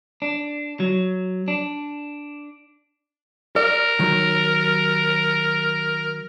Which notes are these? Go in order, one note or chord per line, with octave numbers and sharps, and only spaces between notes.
D4
F#3
D4
A#4 D5
D#3 F#3